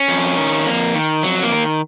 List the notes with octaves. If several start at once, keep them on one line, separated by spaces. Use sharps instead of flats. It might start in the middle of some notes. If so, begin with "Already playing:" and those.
Already playing: C#4
F2
D#3
F2 A#3
D#3
F2 F#3
A#3
D#3